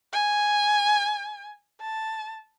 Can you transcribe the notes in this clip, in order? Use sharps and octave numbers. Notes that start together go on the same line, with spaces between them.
G#5
A5